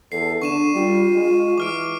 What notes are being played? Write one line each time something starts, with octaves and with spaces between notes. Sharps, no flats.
E2 A4 C7
D3 D4 C#6 D#7 E7
G3 F4
G#3
E3 D6 F6 D7